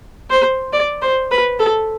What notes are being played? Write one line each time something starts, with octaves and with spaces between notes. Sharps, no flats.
C5
D5
C5
B4
A4